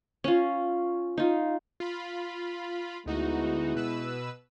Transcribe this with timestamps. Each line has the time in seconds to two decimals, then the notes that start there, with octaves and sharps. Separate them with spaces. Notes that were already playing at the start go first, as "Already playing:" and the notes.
0.24 C#4 F4
1.18 D#4 F4
1.80 F4 B5
3.06 D2 G#3 B3 D#4 E4 F#4
3.75 B2 B4 E6